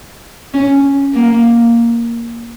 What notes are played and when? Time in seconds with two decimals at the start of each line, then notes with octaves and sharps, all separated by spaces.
0.54 C#4
1.14 A#3